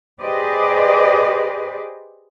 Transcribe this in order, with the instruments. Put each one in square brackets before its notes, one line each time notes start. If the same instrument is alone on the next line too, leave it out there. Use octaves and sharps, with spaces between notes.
[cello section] G4 G#4 B4 C5 D5 D#5